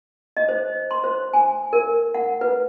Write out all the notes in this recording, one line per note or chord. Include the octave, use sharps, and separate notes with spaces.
D#5
C5
C6
C5
G#5
A#4
F#5
B4